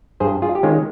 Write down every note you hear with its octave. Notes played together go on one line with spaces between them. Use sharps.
G2 G#4 C5
F4 G#4
G4
D#3 G#3 C#4 F4